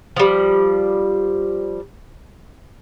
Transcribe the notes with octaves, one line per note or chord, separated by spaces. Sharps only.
F3 G3